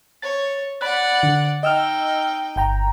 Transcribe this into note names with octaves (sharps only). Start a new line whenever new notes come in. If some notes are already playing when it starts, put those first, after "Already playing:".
C#5 A6
D5 F#5 B5 F#6
D3
D#4 D#5 G5 E6 F6
G1 G5 A#5